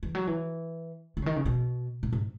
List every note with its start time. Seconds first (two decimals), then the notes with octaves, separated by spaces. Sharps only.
0.03 E3
0.15 F#3
0.27 E3
1.17 F#3
1.22 C#3
1.26 D#3
1.36 C#3
1.46 B2
2.03 A#2
2.13 G#2